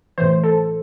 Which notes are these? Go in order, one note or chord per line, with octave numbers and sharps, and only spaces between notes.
A2 E3 C5
A4